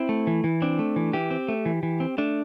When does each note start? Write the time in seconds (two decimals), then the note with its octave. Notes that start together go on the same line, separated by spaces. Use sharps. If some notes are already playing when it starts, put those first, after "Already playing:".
Already playing: C4 E4
0.09 A3
0.27 E3
0.44 E3
0.62 C4 D4
0.79 A3
0.96 E3
1.13 E3 G4
1.30 C4
1.48 A3
1.66 E3
1.83 E3
2.00 C4
2.18 A3 D4